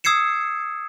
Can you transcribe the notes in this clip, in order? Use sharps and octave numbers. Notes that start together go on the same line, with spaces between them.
D#6 E6 G#6 C7 C#7 E7